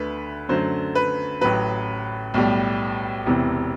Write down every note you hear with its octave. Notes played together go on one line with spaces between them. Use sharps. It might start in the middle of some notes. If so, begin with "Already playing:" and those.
Already playing: D2 D3 A3 B4
F#2 D3 F#3 A3 C5
B4
A1 A2 F#3 B4
B1 A2 G3
E1 E2 C3 E3